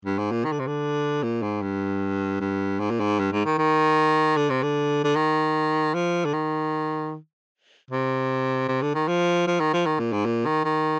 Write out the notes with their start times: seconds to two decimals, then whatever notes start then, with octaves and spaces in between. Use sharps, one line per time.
0.06 G2
0.19 G#2
0.32 A#2
0.44 D#3
0.52 D3
0.59 C3
0.67 D3
1.23 A#2
1.42 G#2
1.62 G2
2.40 G2
2.80 G#2
2.90 A#2
3.00 G#2
3.19 G2
3.32 G#2
3.45 D#3
3.58 D#3
4.37 D3
4.50 C3
4.63 D3
5.04 D3
5.16 D#3
5.94 F3
6.25 D3
6.33 D#3
7.91 C3
8.68 C3
8.82 D3
8.95 D#3
9.08 F3
9.47 F3
9.60 D#3
9.73 F3
9.86 D#3
9.99 A#2
10.13 G#2
10.26 A#2
10.46 D#3
10.65 D#3